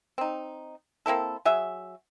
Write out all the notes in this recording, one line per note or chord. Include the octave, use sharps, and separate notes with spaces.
C4 D#4
A#3 C4 E4 A4
F#3 G#4 E5